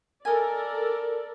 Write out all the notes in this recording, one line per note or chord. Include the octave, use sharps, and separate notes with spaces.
A4 A#4 D5 D#5 G#5